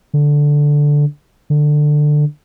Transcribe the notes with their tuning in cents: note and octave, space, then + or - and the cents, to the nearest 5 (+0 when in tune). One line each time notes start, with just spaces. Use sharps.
D3 -5
D3 +15